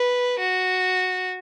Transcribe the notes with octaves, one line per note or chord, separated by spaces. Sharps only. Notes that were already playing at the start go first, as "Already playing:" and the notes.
Already playing: B4
F#4